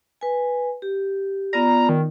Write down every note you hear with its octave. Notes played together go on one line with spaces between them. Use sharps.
B4 G#5
G4
B3 F4 D5 A#5
D#3